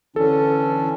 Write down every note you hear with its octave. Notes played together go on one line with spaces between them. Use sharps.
D3 E3 C#4 D4 A4